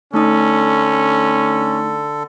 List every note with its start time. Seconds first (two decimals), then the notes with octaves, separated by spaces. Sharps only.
0.14 D3 A3 C#4 D#4 A4 D#6